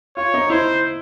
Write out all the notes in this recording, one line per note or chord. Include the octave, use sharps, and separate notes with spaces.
F4 C#5
D#4
E4 C5